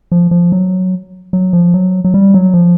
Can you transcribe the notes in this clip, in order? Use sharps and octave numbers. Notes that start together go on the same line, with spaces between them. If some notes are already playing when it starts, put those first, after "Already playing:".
F3
F3
F#3
F#3
F3
F#3
F#3
G3
F#3
F3